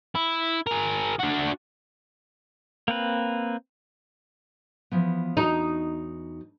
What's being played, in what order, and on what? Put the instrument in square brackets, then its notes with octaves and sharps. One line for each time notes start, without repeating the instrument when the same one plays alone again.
[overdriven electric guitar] E4
G#4 A#4
D4 F#4
[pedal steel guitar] A#3 C4 B4
[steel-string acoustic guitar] E3 F3 B3
[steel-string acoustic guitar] E2 F#4 A#5 [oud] D#4